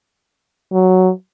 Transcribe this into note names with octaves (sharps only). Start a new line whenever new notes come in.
F#3